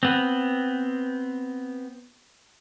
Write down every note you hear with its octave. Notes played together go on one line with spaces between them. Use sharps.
B3 C4